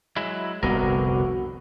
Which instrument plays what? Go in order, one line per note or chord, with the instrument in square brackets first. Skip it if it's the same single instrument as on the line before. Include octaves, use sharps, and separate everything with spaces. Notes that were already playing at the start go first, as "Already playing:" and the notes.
[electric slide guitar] F#3 G#3 E4
[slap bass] F1 C2 G2 [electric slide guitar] D3 B3 A#4 [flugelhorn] F#4